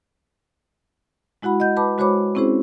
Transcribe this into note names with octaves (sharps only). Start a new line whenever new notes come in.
G#3 E4 F#4 F#5 B5
D#5 F#5 G6
B4 A5 B5 D6
G#3 F#4 C5 C#5 B5 D6
C4 C#4 E4 G#4 C5